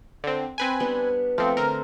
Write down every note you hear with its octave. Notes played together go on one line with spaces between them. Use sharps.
D3 C4
C4 B4 G#5
G3 B3 D4
F3 A3 C4
D3 C4 A#4